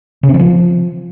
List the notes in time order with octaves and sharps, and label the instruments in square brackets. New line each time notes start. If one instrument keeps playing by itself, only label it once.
[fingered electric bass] C#3
C4
E3
F3